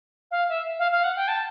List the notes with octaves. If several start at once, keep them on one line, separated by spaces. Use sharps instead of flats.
F5
E5
F5
F5
F#5
G5
A5